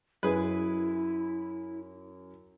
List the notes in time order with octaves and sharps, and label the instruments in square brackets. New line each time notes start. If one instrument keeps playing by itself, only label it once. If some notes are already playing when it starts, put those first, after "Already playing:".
[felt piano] F#2 [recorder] E4 [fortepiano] G#4 B4